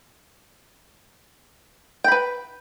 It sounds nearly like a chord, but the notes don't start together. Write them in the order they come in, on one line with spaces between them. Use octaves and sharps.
G5 B5 B4